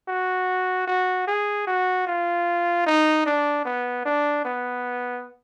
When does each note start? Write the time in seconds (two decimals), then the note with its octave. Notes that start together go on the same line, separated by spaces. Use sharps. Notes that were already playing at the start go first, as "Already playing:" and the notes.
0.08 F#4
0.88 F#4
1.28 G#4
1.67 F#4
2.07 F4
2.86 D#4
3.26 D4
3.65 B3
4.06 D4
4.45 B3